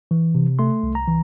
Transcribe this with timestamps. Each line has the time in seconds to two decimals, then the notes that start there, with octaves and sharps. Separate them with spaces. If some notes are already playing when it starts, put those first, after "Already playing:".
0.11 E3
0.35 C3
0.59 A3 C6
0.83 C2
0.95 A#5
1.08 E3